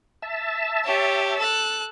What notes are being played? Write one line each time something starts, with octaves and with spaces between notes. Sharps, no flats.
E5 A5
G4 C#5
A4 F#6